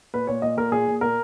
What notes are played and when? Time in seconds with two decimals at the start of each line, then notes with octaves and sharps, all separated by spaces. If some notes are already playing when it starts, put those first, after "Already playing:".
0.14 A#2 B4
0.27 A#2 C#5
0.42 A#2 D#5
0.57 A#2 A#4
0.72 A#2 G#4
0.88 A#2
1.01 A#2 A#4